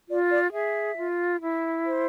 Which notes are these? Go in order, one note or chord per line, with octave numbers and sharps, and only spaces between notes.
F4 D5
D5
G#4 E5
F4
E4
C5